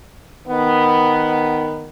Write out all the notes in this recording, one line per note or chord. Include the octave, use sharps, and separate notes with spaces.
D#3 B3